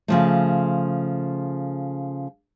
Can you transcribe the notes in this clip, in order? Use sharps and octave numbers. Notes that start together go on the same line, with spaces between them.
C#3 F3 A3